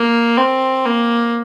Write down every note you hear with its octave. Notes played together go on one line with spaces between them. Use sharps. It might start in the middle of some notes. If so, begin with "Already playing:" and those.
Already playing: A#3
C4
A#3